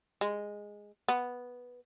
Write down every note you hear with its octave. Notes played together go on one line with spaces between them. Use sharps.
G#3
B3